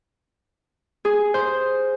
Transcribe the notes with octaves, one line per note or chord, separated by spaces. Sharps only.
G#4
C5